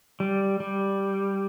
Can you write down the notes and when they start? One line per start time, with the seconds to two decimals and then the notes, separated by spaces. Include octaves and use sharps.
0.20 G3
0.60 G3